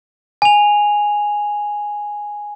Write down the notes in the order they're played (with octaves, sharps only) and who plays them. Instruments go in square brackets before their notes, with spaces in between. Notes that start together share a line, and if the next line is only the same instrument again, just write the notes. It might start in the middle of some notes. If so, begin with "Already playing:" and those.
[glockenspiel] G#5 F7